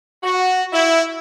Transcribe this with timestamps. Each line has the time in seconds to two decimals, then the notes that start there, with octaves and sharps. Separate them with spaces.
0.24 F#4
0.73 E4